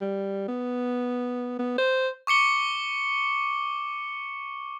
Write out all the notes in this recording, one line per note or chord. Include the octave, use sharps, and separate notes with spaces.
G3
B3
B3
C5
C#6 D6 C#7 G7